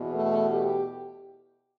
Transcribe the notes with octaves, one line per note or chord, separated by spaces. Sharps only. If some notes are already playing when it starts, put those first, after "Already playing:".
Already playing: E2 B2
A3
G4